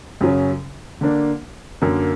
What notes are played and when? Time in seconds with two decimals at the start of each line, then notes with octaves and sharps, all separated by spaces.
0.21 F#2 C#3 F#3 C#4
1.01 D3 A#3 D4
1.82 F#2 D3 A#3